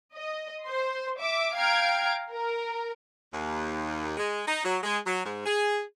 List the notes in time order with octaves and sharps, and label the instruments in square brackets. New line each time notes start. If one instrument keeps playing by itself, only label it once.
[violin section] D#5
C5 C6
E5 D6
F5 G5 A#5 F6 G#6 D7
A#4
[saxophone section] D#2
G#3
D#4
F#3
G#3
F#3
G#2
G#4